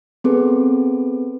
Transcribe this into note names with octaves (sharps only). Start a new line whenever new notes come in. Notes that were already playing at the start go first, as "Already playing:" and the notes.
B3 C4 G#4 A4 B4